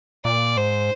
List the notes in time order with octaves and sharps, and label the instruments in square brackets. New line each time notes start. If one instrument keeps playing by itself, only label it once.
[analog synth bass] A#2 [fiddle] D5
[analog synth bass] G#2 [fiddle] C5